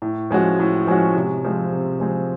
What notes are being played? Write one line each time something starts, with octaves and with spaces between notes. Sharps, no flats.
A2
F3 G#3 C#4 F#4
A2
F3 G#3 C#4 F#4
C3
F3 G#3 C4
C3
F3 G#3 C4